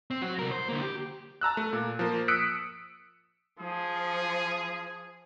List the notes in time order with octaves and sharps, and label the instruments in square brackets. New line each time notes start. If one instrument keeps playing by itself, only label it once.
[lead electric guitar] C4
F#3 F#4
C2 A#4
C5
D3 A#3
G4
[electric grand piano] A5 A#5 E6 F#6
A3
A#2
F3 A#3
D#6 E6 F#6 B6 C#7 D7
[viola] F3 [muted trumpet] G#4